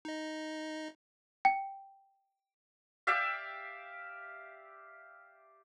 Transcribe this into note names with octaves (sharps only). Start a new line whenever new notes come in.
D#4 D#5
G5
G4 D5 E5 F5